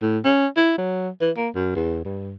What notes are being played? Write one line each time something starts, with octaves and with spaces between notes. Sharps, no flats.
A2
C#4
E4
F#3
E3
A#3
F#2
E2
G2